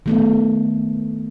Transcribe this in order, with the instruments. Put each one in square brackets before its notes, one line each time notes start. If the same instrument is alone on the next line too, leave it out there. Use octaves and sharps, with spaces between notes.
[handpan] D#3 A3 B3